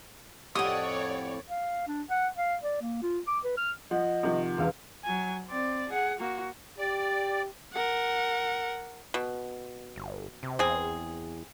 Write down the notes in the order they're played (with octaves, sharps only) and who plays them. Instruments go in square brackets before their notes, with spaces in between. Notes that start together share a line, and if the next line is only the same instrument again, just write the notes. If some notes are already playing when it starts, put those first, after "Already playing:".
[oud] F2 A2 [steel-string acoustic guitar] G4 F#5 [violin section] C#5 D5 [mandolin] D#6
[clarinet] F5
D4
F#5
F5
D5
A#3
F4
D6
B4
F6
[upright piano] F3 [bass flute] D#5 [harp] F#5
[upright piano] C3 D#3 F3
[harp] E1 E5 F5
[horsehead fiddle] F#3 G#5
C4 D5
G#4 F#5
A#3 F#4
[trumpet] G4 [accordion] D5
[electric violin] A#4 F#5
[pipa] B2
[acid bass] G1
C3
[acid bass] E2 [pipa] C4 G#4